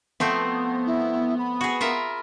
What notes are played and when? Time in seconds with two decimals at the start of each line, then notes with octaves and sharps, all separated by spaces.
0.20 F3 A3 B3 C4
0.87 E4
1.39 B5
1.61 F#4 G#4
1.81 F4 A#4 E5